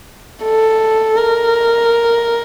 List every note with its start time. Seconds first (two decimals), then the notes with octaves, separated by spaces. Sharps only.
0.44 A4
1.17 A#4